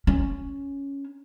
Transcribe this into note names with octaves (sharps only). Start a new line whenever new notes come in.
C#4